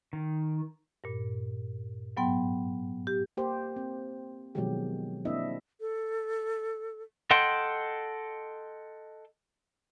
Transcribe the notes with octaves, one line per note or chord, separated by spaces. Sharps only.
D#3
G2 A#2
G#2 F#3 B3 G5 C6
G4
A#3 G4 C5
C4
B2 D#3 F3 F#3 G#3 G4
A#3 C4 D4 E4 D#5 E5
A4
A4 D#5 F#5 G5 C6